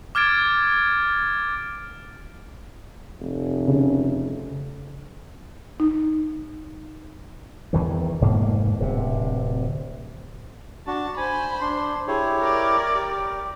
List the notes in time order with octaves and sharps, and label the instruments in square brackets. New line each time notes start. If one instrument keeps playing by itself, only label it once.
[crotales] D6 F6 G#6 A6 D7
[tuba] F1
[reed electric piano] C#3
[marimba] D#4
[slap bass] E2 D#3 E3
F1 G#2 B2 A#3
D1 C3
[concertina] D4 F#4 [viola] A5
[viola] C5 B5 [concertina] G#5
[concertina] D4 C6
[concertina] E4 G4 C#5 [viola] G#4
[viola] A#4 D5
[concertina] G4